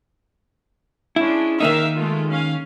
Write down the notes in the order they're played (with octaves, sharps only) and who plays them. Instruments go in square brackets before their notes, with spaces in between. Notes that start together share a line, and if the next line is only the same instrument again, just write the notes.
[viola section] G#3 C#4 D4 [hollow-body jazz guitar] E4
[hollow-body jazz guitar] D#3 A#3 D#4 [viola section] A#4 E5 F5
[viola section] G#3 A3 F4
C#4 F5